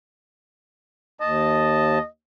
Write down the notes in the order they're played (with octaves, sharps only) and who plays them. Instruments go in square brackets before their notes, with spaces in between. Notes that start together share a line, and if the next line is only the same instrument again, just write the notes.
[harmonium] D#2 A5 [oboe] D#5